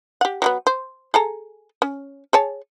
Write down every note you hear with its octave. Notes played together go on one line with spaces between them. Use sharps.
G4 F#5
F#3 G3 B3
C5
G#4 A4 A#5
C#4
G#4 C#5 A5